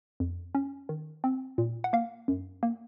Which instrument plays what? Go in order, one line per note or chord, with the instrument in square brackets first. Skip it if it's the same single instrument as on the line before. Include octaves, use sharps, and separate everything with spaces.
[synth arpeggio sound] F2
C#4
D#3
C4
A#2
F#5
A#3 F5
F#2
A#3